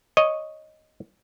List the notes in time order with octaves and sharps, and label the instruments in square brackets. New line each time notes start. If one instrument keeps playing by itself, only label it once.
[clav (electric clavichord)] C#5 D#5